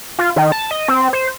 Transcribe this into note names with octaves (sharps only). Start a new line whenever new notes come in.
F4
D#3
A5
D#5
C4
C5